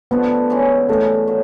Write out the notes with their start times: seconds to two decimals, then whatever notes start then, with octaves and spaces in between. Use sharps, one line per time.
0.11 D3 F3 A3 B3 D4
0.50 E3 G#3 C#4 E4
0.89 C#3 E3 G3 A3
1.27 D#3 F#3 A#3